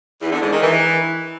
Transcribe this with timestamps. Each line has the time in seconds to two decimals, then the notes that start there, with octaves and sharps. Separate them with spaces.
0.22 E2
0.32 D3
0.42 G#2
0.52 D#3
0.62 E3